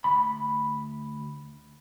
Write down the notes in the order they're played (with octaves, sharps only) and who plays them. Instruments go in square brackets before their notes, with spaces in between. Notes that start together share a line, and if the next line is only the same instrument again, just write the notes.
[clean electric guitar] D2 B5